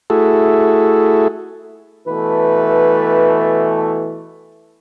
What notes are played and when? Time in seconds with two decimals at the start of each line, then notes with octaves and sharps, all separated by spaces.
0.10 A3 E4 F#4 G#4 A4
2.07 B2 E3 A3 B4